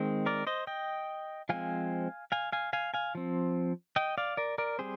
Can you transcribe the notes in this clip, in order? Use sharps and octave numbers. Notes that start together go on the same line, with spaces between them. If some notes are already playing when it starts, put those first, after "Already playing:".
Already playing: D#3 G#3 C4
A#4 D5
C5 D#5
D#5 G5
F3 G#3 C4 F5 G#5
F5 G#5
F5 G#5
F5 G#5
F5 G#5
F3 C4
D#5 G5
D5 F5
A#4 D5
A#4 D5
G3 C4 G#4 C5